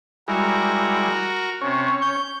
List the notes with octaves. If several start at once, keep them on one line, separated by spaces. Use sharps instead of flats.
G3 G#3 E4 F#4 A#4
C3 C#4 C#5
G6